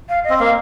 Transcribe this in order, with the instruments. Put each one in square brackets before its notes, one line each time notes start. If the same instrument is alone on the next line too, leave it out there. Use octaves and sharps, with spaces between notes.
[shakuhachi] F5
D#5
[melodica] C4
[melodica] A#3 [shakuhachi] F5